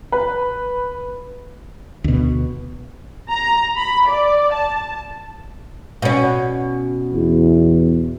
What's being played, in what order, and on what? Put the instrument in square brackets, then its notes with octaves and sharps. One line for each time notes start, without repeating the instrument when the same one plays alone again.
[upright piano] B4
[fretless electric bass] D2 B2
[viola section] A#5
B5
D5
A5
[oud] B2 C#4
[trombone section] E2